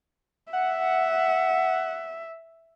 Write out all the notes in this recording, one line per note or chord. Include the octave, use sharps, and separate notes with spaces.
E5 F#5